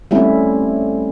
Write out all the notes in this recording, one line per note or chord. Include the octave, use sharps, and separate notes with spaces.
G3 A3 C4 C#4 E4